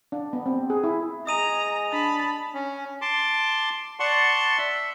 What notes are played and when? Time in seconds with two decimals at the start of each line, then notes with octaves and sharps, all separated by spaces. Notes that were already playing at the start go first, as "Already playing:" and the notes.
0.12 D4
0.33 B3
0.46 C4
0.70 G#4
0.84 E4
1.27 G#3 G#5 A#5 D#6 D#7 F7
1.92 D4 A5 B5
2.54 C#4
3.01 A5 C6 D6
4.00 D5 F#5 A5 C6 C#6
4.58 E5